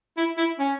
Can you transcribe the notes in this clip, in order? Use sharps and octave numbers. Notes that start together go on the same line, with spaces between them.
E4
E4
C#4